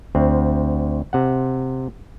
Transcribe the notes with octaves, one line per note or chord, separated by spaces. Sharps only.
D2 C4
C3 F#5